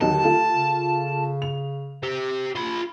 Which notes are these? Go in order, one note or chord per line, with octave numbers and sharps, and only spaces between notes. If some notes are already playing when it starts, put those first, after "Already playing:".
D#2 D3 F#3 D#4 A5
A3 F4
C#3
F7
G4 C5
F4 B5